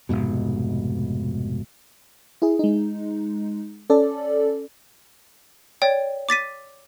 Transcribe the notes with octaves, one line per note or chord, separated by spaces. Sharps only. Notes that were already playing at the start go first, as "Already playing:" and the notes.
F1 A#1 G#2 B2
E4 G#4
G#3 D#4
C#4 A4 D5
C#5 D5 G5
D6 A6 B6 D#7